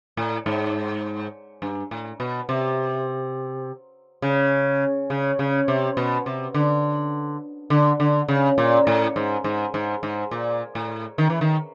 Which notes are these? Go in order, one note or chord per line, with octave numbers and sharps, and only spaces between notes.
A2
G#2
G2
A2
B2
C3
C#3
C#3
C#3
C3
B2
C3
D3
D3
D3
C#3
A#2
A2
G#2
G#2
G#2
G#2
A#2
A2
D#3
E3
D#3